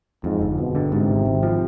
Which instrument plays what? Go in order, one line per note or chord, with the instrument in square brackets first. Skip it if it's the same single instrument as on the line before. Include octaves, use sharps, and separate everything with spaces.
[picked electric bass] F2 [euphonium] G#2
[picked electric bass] G1
[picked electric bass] G1 [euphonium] B2
[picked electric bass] D3
[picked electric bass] G#2 [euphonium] C3
[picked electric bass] G#1
G#1
F3